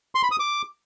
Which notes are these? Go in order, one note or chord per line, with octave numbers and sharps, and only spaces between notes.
C6
B5
D#6
D6